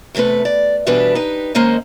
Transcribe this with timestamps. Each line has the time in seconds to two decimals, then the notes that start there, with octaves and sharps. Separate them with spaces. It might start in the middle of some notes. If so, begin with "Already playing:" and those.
0.15 E2 C3 F#3 A3 B4
0.45 D5
0.86 E2 B2 E3 G3 D4 B4
1.15 D#4 G4 B4
1.55 D#3 G#3 A#3 C#4 C5 D#5